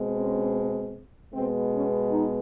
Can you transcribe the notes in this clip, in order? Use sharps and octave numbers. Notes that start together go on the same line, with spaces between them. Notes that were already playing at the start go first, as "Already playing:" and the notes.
Already playing: B2 G#3 C4
C#4
B2 G#3 B3 C4
C#4
D#4